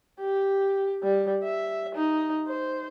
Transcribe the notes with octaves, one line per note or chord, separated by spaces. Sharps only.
G4
G3
E5
D#4
C5